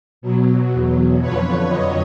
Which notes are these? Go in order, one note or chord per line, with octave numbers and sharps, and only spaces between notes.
B2 F#3
E2 B2 F#3
F2 D3 F3 B4 C#5
F2 D3 F#3 C#5 D#5